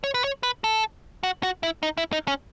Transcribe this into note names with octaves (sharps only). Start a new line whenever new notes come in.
C#5
B4
C#5
B4
A4
F#4
F#4
E4
D#4
E4
D#4
C#4